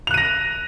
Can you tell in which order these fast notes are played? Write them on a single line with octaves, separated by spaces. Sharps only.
F7 F#6 D#7 A#6